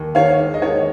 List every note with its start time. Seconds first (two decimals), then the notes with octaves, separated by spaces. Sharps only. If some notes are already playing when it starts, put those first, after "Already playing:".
Already playing: D#2
0.15 D#3 C#5 F5
0.39 G#3
0.54 D#5
0.62 D#2 C#5